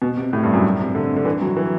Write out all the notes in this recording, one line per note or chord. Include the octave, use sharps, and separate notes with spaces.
B2
C3
A2
G2
F#2
C3
D3
D3
E3
F#3
E3